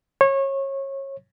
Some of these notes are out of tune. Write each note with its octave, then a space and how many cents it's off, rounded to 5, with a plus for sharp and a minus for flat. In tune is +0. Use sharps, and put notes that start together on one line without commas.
C#5 -25